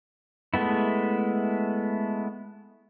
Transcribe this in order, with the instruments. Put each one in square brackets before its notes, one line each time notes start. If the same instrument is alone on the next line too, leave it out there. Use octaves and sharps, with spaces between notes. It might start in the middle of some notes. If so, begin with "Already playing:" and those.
[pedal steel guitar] G#3 A3 B3 E4